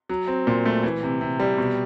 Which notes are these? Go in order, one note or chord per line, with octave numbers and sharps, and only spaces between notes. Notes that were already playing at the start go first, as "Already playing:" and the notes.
F#3
C4
A#2
A3
E3
C3
C3
G3
B2